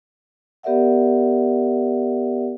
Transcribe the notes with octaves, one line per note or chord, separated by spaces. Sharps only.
B3 G4 A#4 D5 E5 F#5